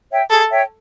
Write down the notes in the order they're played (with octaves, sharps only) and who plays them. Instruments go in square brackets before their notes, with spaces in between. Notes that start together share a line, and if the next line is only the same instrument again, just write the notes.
[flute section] C#5 E5 G5
[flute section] G#4 [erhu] A4
[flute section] C#5 E5 G5